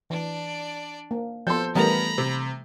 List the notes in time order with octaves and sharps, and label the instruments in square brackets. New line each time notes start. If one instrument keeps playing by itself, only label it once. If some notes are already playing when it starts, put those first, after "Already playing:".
[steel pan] E3 [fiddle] D4 D5
[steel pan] A#3
[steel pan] F3 B3 [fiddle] A4 [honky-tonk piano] C6 G6
[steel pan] E3 G3 A3 [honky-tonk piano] B3 A#4 F7 [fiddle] A#5 B5
[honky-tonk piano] C3